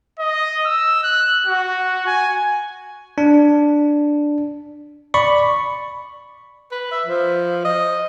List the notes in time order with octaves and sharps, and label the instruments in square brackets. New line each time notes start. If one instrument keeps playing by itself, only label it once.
[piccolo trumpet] D#5
E6
F#6
F#4
G#5
[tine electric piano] D4
D5 B5 C#6
[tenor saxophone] B4
E5
F3
D#5